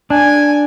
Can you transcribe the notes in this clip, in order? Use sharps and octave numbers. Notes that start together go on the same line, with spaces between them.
D4 G#5